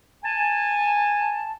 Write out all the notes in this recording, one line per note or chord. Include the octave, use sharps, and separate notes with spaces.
G#5 A5